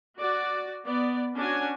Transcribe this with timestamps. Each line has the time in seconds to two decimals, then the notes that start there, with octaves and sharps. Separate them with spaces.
0.18 F#4 D5
0.85 B3 D5
1.36 C#4 D4 F#4 G#5